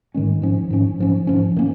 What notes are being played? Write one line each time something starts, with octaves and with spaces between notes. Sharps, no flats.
G#2 D#3 G#3 C#4
G#2 F3 C#4
G#2 F3 C#4
G#2 F3 C#4
G#2 F3 C#4
A#2 A#3 C#4